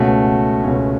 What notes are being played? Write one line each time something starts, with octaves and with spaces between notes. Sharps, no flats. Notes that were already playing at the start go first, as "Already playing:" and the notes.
Already playing: C#2 B2 A3 C#4 F#4
C#2 B2 A3 C#4